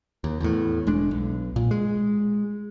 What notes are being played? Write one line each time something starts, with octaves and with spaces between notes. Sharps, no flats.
D#2
E2 A2
E1 G#3 D4
B1
A#2
G#3